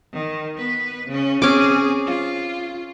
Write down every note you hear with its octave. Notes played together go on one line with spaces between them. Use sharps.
D#3
B3 B4
C#3 C#4
C4 C#4 G#4 D6
F4